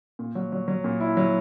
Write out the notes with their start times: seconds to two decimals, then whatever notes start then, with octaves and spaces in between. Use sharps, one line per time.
0.19 A#2
0.35 F#3
0.52 F#3
0.68 F#3
0.84 A#2
1.00 E4
1.17 F#3